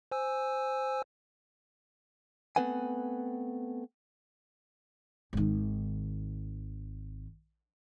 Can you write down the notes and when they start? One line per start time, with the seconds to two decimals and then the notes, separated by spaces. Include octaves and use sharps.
0.11 C5 G#5 E6
2.56 A3 B3 C4 B4 F#5 G#5
5.33 G#1 D#3